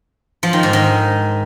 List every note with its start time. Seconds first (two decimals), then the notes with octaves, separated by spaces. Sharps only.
0.43 F3
0.53 D#3
0.63 G#2
0.73 D#3